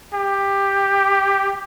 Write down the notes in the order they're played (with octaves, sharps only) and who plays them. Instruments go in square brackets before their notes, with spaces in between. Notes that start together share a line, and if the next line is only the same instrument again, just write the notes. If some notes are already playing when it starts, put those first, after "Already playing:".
[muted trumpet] G4